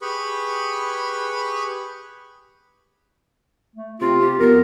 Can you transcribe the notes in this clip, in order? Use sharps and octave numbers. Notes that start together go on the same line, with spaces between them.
G4 G#4 B4 B5 C#6
A3
C3 C4 F4
G4
F2 B3 A#4